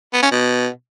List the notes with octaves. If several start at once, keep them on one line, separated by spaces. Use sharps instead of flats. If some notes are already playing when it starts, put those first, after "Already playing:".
B3
C#4
B2